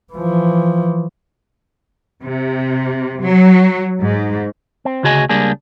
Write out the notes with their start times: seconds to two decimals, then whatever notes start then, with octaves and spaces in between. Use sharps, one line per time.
0.13 E3 F3
2.23 C3
3.21 F#3
4.02 G#2
4.85 C4
5.03 D2 C#3 F#4 G#4 D#5 G#5
5.29 C#2 G3 A#3 D4 G#4